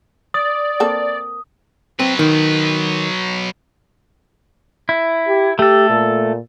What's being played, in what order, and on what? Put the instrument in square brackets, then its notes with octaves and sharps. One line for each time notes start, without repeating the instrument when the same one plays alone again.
[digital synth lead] D5 [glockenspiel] D#6
[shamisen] A#3 C4 A4
[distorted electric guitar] F#3 B4 [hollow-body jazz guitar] C4
[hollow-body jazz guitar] D#3
[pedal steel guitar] E4
[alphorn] G4
[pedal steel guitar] A3 A4 [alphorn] G4
[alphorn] A#2